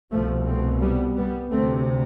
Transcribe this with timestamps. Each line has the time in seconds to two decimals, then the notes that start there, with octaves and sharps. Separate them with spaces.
0.12 C2 B2 F3 A3
0.47 A3 C4
0.82 G3 B3
1.17 G3 B3
1.51 D2 C3 A3 C4